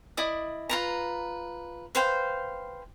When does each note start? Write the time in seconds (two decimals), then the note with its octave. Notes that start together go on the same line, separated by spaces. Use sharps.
0.17 E4 D5 D#5 D#6
0.69 F4 B4 A#5
1.95 B4 C5 F5 G5